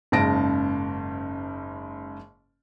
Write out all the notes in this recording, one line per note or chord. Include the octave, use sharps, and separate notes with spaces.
F#1 G#2 C#3 A5 A#6 D7